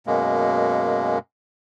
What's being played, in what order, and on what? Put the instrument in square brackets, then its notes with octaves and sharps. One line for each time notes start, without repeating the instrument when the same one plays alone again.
[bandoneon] F#2 B2 G#3 A#3